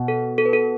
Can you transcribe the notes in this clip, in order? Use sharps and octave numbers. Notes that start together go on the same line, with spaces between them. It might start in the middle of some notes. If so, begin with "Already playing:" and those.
Already playing: B2
A4
A4
B4
A4